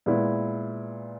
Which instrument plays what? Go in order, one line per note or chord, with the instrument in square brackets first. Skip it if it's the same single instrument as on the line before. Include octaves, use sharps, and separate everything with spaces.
[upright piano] A#2 G#3 B3 E4